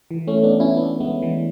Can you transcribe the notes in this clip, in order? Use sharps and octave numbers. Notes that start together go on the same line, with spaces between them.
E3
A3 C#4
B3 D4
C#4 E4
B3 D4
G#3 B3
E3 G#3